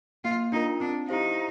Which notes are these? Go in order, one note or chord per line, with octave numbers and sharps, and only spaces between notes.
A#3 F4
D4 D#4 F4 A#4
C4 D4
D#4 E4 G4 C5 F5